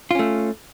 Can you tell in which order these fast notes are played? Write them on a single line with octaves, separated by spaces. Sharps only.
F4 C#4 A3